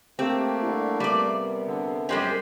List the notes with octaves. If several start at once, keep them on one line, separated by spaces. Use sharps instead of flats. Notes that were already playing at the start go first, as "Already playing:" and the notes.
A3 A#3 C4 G4
D3 G3 E4
C3 G3 B3 A#4 D5
D3
F#2 G3 G#3 C#4 G4 C5